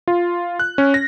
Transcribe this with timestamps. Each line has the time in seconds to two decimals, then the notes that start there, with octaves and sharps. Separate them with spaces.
0.08 F4
0.60 F#6
0.78 C#4
0.94 A#6